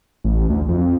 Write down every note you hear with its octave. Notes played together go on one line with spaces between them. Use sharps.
A1
D2
F2